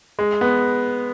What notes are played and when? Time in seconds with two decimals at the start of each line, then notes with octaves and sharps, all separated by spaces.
0.19 G#3
0.41 B3